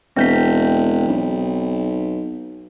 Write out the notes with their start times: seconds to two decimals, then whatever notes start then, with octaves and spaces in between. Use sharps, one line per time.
0.16 E1 C4 G6 B6
1.08 B1